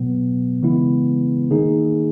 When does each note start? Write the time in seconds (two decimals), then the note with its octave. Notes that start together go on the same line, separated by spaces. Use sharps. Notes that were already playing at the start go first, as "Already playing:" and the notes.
Already playing: B2 F#3 B3
0.63 C#3 E3 G#3 B3 E4
1.51 D#3 A#3 D#4 G#4